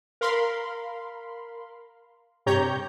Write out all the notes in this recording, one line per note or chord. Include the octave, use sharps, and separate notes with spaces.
A#4 F5 B5 C6
G2 C3 G4 C#5 A#5 G6